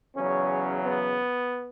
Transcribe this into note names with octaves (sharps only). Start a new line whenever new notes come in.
E2 C#3 F#3 C#4
B3